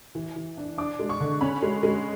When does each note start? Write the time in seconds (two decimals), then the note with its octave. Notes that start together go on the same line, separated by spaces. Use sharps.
0.15 E3
0.36 E3
0.57 D4
0.78 D4 D6
0.99 G#3
1.09 C#6
1.20 D3
1.41 C#4 B5
1.62 G#3
1.83 G#3